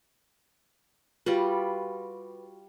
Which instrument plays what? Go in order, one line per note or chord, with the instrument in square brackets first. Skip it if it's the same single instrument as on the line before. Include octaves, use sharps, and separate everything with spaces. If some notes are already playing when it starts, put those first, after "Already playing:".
[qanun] G3 F4 F#4 B4